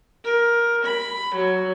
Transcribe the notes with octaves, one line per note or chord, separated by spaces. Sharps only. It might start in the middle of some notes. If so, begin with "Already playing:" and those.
A#4
B5
F#3